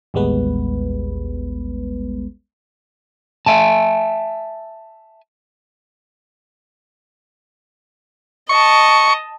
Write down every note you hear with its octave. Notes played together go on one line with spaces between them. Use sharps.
A1 D#2 G3 G#3 B3 B4
E5 G#5 A5
D#5 A5 C#6